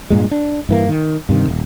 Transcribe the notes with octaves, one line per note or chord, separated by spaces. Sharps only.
G2 A#2 G#3
D4
G2 E3 A#3
D#3
G2 C3 D#3
D#1